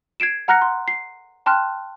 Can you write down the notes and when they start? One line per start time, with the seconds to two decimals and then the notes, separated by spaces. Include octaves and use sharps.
0.20 G#6 C7 D7 E7
0.48 F#5 A#5 F6 F#6 A#6 C#7
0.62 C6
0.88 C7
1.46 G5 A5 C6 F6 F#6